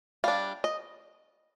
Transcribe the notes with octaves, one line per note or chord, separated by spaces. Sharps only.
G3 D4 F5
D#5